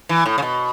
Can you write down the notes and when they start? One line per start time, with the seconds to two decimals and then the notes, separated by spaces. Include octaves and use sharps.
0.09 E3
0.26 A2
0.38 C#3
0.42 B2